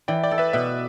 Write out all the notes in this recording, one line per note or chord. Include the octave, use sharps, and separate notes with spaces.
E3 D5 G5
D5 G5
A4
B4 E5
B2 B4 E5